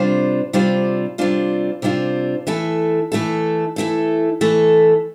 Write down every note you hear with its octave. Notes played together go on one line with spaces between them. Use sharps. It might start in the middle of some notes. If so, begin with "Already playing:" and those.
Already playing: C3 G3 D4 F4 C5
C3 G3 D4 F4 C5
C3 G3 D4 F4 C5
C3 G3 D4 F4 C5
E3 A3 E4 A4
E3 A3 E4 A4
E3 A3 E4 A4
E3 A3 E4 A4